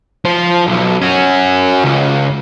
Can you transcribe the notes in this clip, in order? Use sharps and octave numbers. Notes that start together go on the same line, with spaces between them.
F3 C5
B1
C#4 F#4
C#2